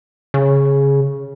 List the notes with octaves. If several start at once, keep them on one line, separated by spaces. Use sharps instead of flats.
C#3